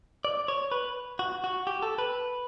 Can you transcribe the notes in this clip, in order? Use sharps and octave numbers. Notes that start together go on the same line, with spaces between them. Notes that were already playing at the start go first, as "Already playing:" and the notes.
D5
C#5
B4
F#4
F#4
G4
A4
B4